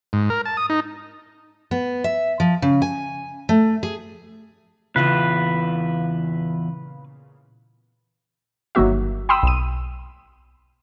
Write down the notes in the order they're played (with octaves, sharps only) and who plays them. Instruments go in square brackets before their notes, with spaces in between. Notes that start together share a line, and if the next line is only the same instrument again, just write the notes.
[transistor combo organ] G#2
A#4
A5
D#6
D#4
[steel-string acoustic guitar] B3
E5
F3
C#3
G#5
A3
G#4
[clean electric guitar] E2 E4 F4 [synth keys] A#2 C#3 F5 [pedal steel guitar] B4
[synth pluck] G1 D#3 F#3 A#3 F#4 E5
G5 B5 C6 D#6 E6
B1 D#7